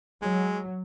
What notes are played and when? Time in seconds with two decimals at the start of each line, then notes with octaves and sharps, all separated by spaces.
0.22 F#3 G#3